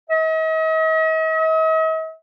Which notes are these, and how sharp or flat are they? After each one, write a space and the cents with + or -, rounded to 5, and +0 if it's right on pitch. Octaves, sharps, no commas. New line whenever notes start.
D#5 +45